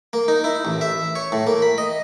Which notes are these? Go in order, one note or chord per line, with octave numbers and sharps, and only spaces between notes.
A#3
D#4
E4
A1
E5
C#5
A2
A#3
B5
D#5